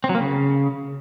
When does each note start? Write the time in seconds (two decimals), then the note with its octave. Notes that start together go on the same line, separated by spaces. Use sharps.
0.04 C4
0.09 F#3
0.15 A#3
0.20 C#3